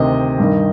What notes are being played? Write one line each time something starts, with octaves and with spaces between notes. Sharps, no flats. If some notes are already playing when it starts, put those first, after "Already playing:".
Already playing: D2 C3 D#3 D#5
G2 D#3